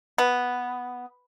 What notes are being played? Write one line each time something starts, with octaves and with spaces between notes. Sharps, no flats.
B3